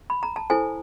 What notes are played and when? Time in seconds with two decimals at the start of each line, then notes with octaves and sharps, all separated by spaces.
0.10 B5
0.23 A#5
0.36 A5
0.50 E4 A4 C5 G#5